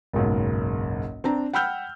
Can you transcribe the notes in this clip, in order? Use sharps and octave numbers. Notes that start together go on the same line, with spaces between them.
F#1 B1 G#2
C4 D4 A#5
F#5 G5 B5 E6 F6 G6